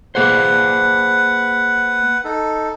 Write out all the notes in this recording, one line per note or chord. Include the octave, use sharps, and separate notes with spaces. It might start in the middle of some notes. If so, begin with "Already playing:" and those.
A#3 G#4 B4 C5 F#5
D#4 A4